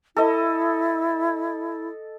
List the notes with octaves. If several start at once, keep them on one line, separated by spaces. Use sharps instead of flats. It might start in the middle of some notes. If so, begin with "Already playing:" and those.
E4 A4 D#5